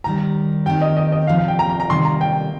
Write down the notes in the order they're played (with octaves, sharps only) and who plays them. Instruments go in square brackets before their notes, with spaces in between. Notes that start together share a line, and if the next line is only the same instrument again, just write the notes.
[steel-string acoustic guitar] D#2 D#3 G3 [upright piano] A#5
[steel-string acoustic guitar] D#3 C4 G4 [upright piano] G5
[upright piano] D#5
D#5
D#5
[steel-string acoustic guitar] C3 F3 D#4 G4 [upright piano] F5
[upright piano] F5
G5
A#5
A#5
A#5
[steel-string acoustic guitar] C3 D#3 G3 A#3 [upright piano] C6
[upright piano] A#5
G5